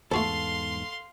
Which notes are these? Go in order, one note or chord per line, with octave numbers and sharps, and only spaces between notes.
E2 G#2 A3 F#4 A4 C5 F5 C6